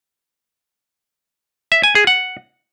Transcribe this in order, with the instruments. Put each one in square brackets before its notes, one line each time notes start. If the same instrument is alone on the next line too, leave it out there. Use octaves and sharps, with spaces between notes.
[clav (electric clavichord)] E5
G#5
G#4
F#5